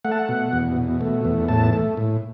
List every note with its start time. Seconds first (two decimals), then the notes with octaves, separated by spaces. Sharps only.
0.05 A3 F#5
0.11 A5
0.19 F#5
0.29 B2
0.53 E2
0.77 B2
1.01 A3
1.25 E2
1.48 A2 A5
1.73 A3
1.97 A2